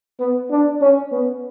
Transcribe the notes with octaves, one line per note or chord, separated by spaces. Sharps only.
B3
D4
C#4
B3